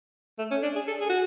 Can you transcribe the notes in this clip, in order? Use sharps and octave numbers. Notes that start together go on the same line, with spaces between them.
A3
C#4
D4
G#4
A4
G#4
F#4